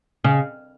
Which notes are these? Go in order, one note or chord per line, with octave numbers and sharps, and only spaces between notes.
C#3